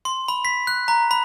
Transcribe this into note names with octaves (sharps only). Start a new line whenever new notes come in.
C6
B5
B6
F#6
A#5
B5